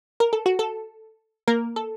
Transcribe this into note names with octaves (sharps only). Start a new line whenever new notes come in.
A#4
A4
F#4
A4
A#3 A#4
A4